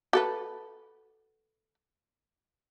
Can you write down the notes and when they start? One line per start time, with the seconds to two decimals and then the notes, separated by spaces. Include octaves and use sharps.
0.13 F#4 A4 B4